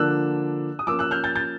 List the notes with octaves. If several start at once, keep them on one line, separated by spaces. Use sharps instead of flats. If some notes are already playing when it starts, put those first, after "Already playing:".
Already playing: D3 F3 A#3 D4 E6 F#6
D#6
F3 A#3 C#4 D6 E6
E6 F#6
F6 G6
G6 A6
G6 A6